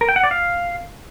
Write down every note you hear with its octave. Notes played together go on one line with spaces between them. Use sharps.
A#4
G5
F#5
D5
F5